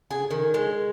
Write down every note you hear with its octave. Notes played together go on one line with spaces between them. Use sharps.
G#4
D#3
G#3